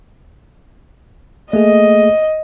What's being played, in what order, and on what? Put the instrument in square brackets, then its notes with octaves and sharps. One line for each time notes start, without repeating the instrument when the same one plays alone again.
[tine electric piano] A3 A#3 G#4 [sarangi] D#5